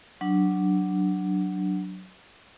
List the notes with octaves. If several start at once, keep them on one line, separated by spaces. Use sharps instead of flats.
F#3 D4